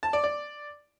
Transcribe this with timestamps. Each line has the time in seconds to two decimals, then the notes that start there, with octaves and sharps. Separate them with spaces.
0.03 A5
0.13 D5
0.24 D5